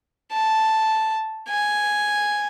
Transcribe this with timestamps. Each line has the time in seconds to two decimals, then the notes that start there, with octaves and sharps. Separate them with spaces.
0.32 A5
1.49 G#5